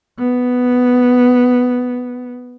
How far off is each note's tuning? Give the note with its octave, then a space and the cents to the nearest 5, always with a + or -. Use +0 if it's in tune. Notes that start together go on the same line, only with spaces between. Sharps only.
B3 +5